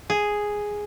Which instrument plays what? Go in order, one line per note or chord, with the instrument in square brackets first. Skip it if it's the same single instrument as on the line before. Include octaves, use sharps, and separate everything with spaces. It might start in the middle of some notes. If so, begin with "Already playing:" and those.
[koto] G#4